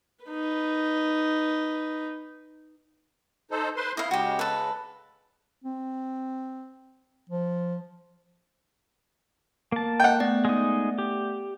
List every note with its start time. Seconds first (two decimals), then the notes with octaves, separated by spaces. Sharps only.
0.26 D#4 B4
3.51 D#4 A4 C5
3.76 B4 C5 C6
3.97 E4 D#5 F5
4.11 C#3 G#3 F#4 G4
4.39 A4 B4
5.64 C4
7.30 F3
9.72 A#3 A5
10.00 F#5 G5
10.20 A3 B3 D5
10.45 G#3 D#4
10.98 G4